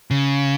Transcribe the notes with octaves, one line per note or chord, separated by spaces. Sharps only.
C#3